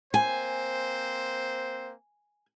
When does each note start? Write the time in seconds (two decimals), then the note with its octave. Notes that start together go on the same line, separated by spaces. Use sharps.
0.14 A#3 C4 C5 G#5